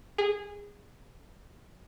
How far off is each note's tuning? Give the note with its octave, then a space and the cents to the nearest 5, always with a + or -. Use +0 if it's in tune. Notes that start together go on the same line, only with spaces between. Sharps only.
G#4 -20